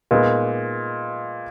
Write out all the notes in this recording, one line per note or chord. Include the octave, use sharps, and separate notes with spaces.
A#2 G#3 B3 D#4